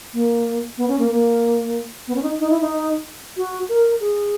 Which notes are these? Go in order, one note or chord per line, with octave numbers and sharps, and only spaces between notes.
A#3
B3
C#4
A#3
A#3
B3
C#4
D#4
D#4
E4
D#4
F#4
A#4
G#4